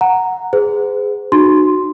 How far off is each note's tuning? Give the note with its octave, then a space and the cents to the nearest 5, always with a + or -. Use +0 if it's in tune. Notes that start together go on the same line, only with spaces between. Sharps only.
F#5 +0 A#5 -10
G#4 +0 B4 +45
D#4 -45 F#4 +0 C6 +0